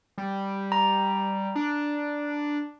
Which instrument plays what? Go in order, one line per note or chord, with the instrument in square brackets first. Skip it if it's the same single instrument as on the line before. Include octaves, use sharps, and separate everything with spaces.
[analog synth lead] G3
[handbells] A#5
[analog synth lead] D4